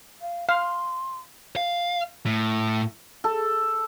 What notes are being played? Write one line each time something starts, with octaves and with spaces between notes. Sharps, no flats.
F5
F5 C6
F5
A2
A4